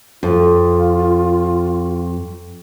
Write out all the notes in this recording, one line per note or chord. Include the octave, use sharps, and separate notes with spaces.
F2 F4